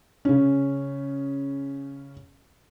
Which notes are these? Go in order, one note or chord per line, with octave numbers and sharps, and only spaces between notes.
C#3 C#4